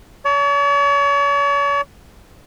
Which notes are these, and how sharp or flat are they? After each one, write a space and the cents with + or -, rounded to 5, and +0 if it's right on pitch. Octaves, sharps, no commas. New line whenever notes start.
C#5 +40 A5 +0